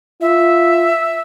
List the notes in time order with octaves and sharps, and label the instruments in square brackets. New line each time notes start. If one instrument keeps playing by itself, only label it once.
[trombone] F4 [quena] E5